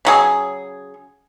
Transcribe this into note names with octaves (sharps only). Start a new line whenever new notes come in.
C#3 F#3 G#4